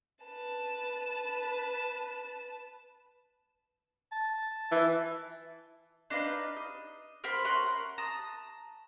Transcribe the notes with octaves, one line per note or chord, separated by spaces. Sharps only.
B4 A5
A5
E3
D4 D#4 B4 F5
D#5
A#4 C5 B5 C6
C#4 A#4 F#5 C6
A5 A#5 D#6